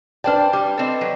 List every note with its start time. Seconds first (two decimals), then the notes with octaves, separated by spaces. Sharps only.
0.24 D4 B4 C5 D5 G5 A5 F6
0.53 G3 D6
0.78 C4 A4 D5 D#5
1.01 F#3